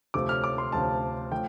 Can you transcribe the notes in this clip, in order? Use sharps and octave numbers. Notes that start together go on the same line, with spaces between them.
D2 C3 F3 A3 D6
F6
D6
C6
D2 C3 F3 A3 A5
F3 A3 G5